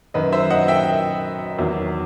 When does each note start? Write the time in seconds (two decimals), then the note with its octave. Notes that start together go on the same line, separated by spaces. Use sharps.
0.14 F#2 D#3 F#3 B4 D#5
0.32 C5 E5
0.50 D#5 F#5
0.68 E5 G5
1.59 E2 D#3 F#3